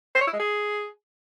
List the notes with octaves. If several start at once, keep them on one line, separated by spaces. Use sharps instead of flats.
C5
C#5
E4
G#3
G#4